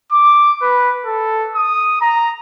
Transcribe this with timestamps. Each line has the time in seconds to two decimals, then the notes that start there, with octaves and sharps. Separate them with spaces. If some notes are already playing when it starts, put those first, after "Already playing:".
0.12 D6
0.62 B4
1.06 A4
1.56 D#6
2.01 A#5